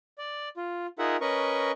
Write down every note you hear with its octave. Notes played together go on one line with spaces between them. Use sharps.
D5
F4
D#4 F4 G#4 A#4 E5 F#5
C#4 A#4 B4 D#5 C#6